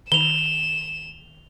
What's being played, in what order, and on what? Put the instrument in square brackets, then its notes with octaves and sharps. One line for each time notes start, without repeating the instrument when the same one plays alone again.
[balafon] D#3 [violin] E7 [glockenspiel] F7 G7